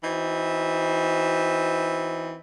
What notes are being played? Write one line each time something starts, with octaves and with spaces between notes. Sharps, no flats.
E3 C4 D#4 F#4